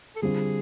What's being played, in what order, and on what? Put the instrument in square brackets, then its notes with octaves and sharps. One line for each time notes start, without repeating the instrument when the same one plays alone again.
[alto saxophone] A4
[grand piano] D3 G3 C4 F4 [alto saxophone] G#4